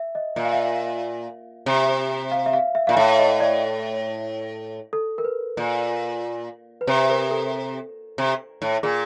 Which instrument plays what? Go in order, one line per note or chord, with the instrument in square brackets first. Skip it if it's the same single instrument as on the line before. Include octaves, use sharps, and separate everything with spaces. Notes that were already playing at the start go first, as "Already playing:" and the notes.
Already playing: [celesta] E5
D#5
[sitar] A#2 [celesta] E5
[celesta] F5
E5
[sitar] C3
[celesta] F5
E5
F5
E5
[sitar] A#2 [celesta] F5
[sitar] A2 [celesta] E5
[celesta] D#5
D5
A4
A#4
B4
[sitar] A#2
[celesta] B4
[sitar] C3 [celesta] C5
[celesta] A#4
A4
[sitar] C3
A2
[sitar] A#2 [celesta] G#4